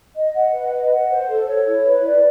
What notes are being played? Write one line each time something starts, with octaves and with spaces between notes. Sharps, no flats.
D#5
F#5
B4
D#5
F#5
C5
A4
C#5
E4
B4
D5